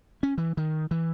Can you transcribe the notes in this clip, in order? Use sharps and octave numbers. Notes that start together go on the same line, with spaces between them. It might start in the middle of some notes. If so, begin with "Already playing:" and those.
C#4
E3
D#3
E3